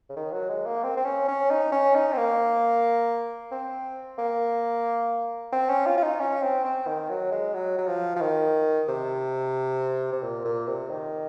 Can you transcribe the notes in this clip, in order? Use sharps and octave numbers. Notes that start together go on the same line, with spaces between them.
C#3
D#3
F#3
G#3
A#3
C4
C4
C#4
C#4
D#4
C#4
D#4
C4
A#3
C4
A#3
C4
C#4
F4
F4
D#4
C#4
C4
C4
D#3
F#3
G#3
F#3
F#3
F3
F3
D#3
C3
C3
A#2
A#2
C3
D#3